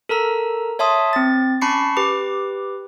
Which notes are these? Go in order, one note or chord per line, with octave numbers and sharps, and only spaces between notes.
A4 A#4 A#5 E6
C#5 E5 A5 C6 D#6
C4 A6
C#4 A5 B5 C#6 C7 C#7
G4 B4 D6